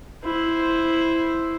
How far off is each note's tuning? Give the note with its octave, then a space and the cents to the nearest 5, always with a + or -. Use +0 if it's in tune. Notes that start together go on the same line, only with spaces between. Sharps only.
E4 +0 C5 +0